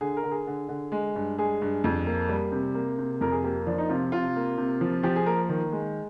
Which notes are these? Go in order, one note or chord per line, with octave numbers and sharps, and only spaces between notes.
D3 G#4
A#4
D3
G#4
D3
D3
G#3
G2
G#3 G#4
G2
F2
A#3
G3
C3
A#3
C3
F2 A#4
G#4
A#3 G4
F3 D4
D#4
C3 F4
C3 F4
A#3
C3
F3
F3 G4
G#4
A#3 A#4
D#3
G#3